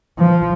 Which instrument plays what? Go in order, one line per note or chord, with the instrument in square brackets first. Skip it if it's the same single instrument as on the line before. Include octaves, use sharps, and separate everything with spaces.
[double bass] F3